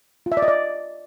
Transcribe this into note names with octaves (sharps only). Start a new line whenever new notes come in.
F4
E5
D5
D#5
D5